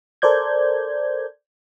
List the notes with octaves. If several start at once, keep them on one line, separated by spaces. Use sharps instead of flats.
A4 A#4 C5 D5 G6 G#6